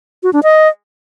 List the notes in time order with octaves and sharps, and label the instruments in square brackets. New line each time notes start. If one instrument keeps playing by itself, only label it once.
[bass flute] F#4
D4
D#5